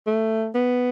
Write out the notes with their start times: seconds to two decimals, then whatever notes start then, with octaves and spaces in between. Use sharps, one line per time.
0.07 A3
0.55 B3